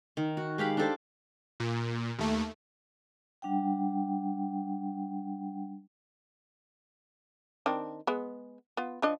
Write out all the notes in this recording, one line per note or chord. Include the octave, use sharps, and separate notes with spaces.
D#3
F#4
G#3 G4 F5 B5
D4 G4 A4 C5
A#2
D#2 A3
G3 D4 F#5 G5
D#3 C4 D4
G#3 B3
B3 F4
F3 D4 D#5